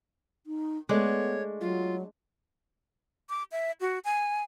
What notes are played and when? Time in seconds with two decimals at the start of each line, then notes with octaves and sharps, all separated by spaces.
0.47 D#4
0.89 G#3 A3 B3 D4 C#5
1.61 F#3 F4
3.29 D6
3.52 E5
3.81 F#4
4.05 G#5